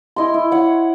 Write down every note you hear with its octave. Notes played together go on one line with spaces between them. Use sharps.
E4 D#5 C6
E4
C#5 F#5